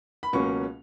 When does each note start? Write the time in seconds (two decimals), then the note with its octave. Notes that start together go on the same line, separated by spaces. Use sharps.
0.23 B5
0.33 C#2 B2 F#3 A#3 C#4 C#6